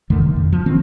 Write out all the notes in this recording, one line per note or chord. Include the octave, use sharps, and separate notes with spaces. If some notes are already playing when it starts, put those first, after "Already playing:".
F2 D3 D#3 A3
C3
F2
F3
D#3 A#3 C4